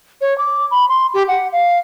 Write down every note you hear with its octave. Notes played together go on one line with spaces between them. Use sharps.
C#5
D6
B5
C6
G4
F#5
F5